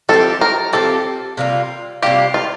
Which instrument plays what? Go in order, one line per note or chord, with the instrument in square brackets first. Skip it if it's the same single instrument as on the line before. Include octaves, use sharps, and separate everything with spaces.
[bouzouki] F3 C4 G4 [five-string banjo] A4
[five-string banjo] A#4
[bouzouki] F3 C4 G4 [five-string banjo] A4
[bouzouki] C3 G3 A#3 F4
[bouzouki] C3 G3 A#3 F4 [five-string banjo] G4
[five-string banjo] F4